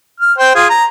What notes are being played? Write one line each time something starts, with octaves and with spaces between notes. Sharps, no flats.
F6
C5 G5
F4 G#4
A#5